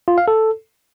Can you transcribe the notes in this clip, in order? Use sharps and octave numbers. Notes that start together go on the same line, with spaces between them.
F4
F5
A4